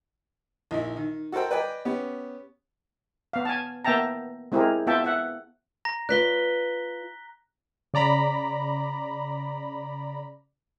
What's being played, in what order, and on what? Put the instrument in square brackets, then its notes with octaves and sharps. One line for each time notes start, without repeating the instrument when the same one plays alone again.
[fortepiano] A#1 D#4 E4
D#3
F#4 A4 A#4 C5 G5
B4 D5 D#5 G5 G#5
B3 C#4 G4
[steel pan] B3 F5
G#5 A5
A#3 B3 E5 G5 A5 A#5
G#3 C4 E4 G4 G#4 A#4
B3 F4 E5 G5 A5
E5 F#5
[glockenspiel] A#5 A#6
[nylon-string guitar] F4 B4 D5 [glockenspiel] F#6 B6 G7
[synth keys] C#3 D5 A#5 B5